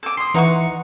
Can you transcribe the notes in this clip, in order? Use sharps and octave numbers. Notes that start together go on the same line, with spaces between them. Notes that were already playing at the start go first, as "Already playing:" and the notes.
A4 D6
C6 D#6 C7
E3 D#4 B4 E5 F#5 C#6